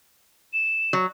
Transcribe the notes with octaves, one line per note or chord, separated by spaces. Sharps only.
E7
F#3